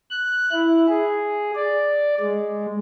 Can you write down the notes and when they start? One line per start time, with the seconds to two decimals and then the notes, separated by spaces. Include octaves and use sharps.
0.11 F#6
0.52 E4
0.89 G#4
1.55 D5
2.21 G#3